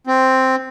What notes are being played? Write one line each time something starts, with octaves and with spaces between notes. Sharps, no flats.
C4